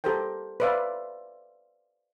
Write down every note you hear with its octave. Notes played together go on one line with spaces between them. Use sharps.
G4 A4 A#4 C5 G5
B4 C5 D5 E5 F5